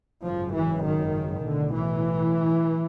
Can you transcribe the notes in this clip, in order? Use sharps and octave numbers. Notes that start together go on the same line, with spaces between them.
G#1 F#2 C#3 F3
E3
D#3
B1 A2 D3
E3